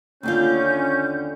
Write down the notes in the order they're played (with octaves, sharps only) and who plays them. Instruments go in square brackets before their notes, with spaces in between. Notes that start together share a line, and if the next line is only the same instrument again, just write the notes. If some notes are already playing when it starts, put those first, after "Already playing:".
[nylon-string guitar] D#2 D3 F4 [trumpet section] C#4 [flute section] G6